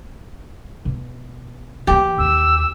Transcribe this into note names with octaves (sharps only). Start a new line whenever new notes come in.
B2
E3 A#3 G4
D#2 E6